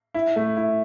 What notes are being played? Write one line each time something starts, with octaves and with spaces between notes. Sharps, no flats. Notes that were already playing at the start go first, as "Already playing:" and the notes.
E4
A3
E4